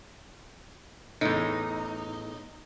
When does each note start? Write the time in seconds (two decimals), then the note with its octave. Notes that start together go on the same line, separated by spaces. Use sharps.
1.21 E2 A2 D#4